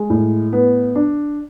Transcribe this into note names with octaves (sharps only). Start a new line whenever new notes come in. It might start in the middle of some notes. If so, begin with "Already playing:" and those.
Already playing: G#3
A2
B3
D4